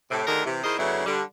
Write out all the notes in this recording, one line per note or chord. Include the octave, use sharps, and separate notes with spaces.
A2 C3
D2 D3 D#3 G#4 A#4
C3 E3
D#3 E4 G#4 A#4 C5 D#5
F#2 C#3 A3 B3 D4 E4
D3 G3